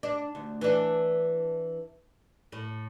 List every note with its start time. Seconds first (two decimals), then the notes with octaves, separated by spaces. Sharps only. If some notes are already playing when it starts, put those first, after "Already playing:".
0.03 D4
0.35 D2
0.61 E3 D4
2.52 A2